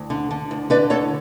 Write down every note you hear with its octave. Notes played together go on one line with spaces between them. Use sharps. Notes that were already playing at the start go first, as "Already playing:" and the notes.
Already playing: D2
D3
D3
D2
D3 B4 D5
D2 A4 C#5